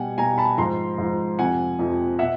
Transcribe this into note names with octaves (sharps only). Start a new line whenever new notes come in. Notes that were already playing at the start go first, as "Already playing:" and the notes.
Already playing: B2 G3 F#5 G#5
B2 G3 G#5 A#5
A5 B5
G#2 F3 A#5 C6
G#2 F3
F2 C3 F3 F#5 G#5
F2 C3 F3
B2 E5 F#5